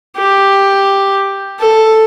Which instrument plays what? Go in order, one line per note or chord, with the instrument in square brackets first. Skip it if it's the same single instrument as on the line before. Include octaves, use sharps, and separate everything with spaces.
[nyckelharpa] G4
A4